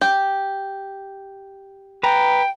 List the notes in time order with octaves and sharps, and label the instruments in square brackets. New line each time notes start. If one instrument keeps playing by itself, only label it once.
[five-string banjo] G4
[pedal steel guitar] B4 A#5 [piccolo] G5